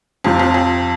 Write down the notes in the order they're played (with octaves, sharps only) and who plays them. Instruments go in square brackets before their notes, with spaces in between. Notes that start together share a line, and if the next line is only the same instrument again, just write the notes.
[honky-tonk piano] F2 [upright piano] C3 F3 C4
[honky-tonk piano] F2
F2